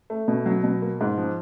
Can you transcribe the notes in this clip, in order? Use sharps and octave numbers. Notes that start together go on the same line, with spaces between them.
A3
B2
F#3
B2
A#3
G#2
F3